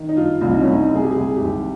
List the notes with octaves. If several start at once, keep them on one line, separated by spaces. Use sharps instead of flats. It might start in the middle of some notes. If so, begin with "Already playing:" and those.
Already playing: D#3
D#4
G2 F4
C2 F4
D#4
C2 C#4
D#4
C2
G#4
G4
C2 G#4
G#1 G4